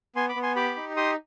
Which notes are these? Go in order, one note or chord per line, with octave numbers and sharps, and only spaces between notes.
B3 G#5 C6
B5 D6
B3
G#5 C6
G4 B5 D6
D#4
G4 C6 D#6